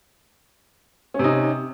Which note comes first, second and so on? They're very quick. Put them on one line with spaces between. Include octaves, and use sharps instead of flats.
C#4 C3 D#4